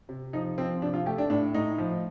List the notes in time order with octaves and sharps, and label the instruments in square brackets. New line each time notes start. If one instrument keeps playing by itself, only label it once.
[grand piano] C3
F3 D#4
F3 C4
C3 D4
F4
A3 G4
D4
A2 D4
A2 D#4
F3